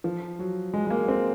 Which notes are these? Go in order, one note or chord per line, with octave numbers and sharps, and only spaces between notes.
F3
F#3
G#3
G#3
A#3
C4